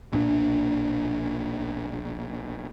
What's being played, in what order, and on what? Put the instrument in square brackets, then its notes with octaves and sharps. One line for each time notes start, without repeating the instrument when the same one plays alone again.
[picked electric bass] B1 A#2 C#4 D4